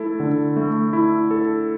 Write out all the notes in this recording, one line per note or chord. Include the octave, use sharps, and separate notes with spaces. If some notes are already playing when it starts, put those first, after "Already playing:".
Already playing: A3 E4 A4
D3
A3
E4
A4